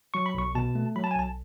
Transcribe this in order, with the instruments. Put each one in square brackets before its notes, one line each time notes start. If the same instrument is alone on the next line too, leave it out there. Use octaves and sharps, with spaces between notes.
[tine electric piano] F#3 C#6
B5
B1 C#6
B2 A5
A3
F#3 B5
A5
G#5
B1 A5